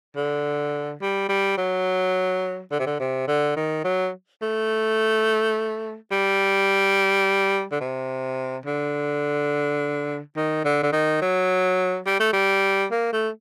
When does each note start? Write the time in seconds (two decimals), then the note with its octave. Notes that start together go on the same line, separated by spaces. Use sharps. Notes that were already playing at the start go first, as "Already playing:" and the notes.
0.16 D3
1.01 G3
1.29 G3
1.58 F#3
2.71 D3
2.79 C3
2.86 D3
3.00 C3
3.28 D3
3.56 D#3
3.84 F#3
4.41 A3
6.11 G3
7.72 D3
7.80 C3
8.66 D3
10.36 D#3
10.65 D3
10.83 D3
10.92 D#3
11.21 F#3
12.06 G3
12.20 A3
12.33 G3
12.91 A#3
13.13 A3